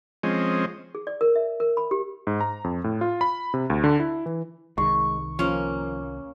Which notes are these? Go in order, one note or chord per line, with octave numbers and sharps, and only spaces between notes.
F3 G#3 C4 C#4 D#5
G#4
D5
A#4
E5
A#4
B5
G4
G#2
A#5
F2
A2
F4
B5
C3
D2
D3
E4
E3
C2 D#3 G#3 C#6
F3 A#3 C#4